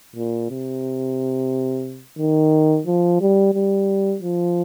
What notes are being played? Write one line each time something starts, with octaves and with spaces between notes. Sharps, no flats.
A#2
C3
D#3
F3
G3
G3
F3